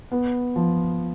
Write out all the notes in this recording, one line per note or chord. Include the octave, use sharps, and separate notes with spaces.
B3
F3